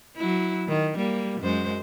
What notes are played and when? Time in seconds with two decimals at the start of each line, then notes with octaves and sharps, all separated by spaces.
0.17 F#3 E4
0.68 D#3
0.97 G3 A#3
1.40 F#2 G#3 C5